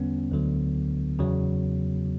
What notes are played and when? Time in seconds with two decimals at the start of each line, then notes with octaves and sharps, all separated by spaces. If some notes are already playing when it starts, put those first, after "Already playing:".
Already playing: E2 D3 G3 B3 C#4
0.31 D2 D3 F#3
1.19 E2 C#3 F#3